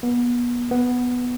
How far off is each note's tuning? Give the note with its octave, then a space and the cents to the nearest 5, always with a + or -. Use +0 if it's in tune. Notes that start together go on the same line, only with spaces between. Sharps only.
B3 -30
B3 +0